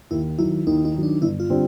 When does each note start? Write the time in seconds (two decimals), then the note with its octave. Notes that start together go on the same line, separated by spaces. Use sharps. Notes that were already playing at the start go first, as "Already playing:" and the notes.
0.11 D#2 E4
0.39 D#3 F#3 E4
0.66 D#2 D#4
0.85 D#4
0.94 D#3 F#3
1.03 D4
1.21 G1 E4
1.40 F4
1.50 D3 G3 C4